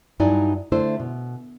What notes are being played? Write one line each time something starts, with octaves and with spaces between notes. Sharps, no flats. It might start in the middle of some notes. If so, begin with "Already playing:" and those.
G2 F#3 D#4 E4 D5 G#5
D3 A3 D4 E4 C5
B2